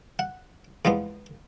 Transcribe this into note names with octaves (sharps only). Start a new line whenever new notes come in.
F#5
E2 F3 G#3 B3